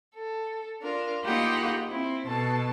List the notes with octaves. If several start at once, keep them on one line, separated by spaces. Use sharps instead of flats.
A4
D4 F4 A#4
A#3 D#4 F4 G4 F#5 B5
C4 E4
B2 A4 A5